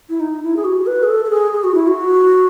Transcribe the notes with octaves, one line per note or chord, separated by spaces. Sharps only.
E4
D#4
E4
G#4
F#4
B4
G#4
A4
A4
G#4
G#4
F#4
E4
F#4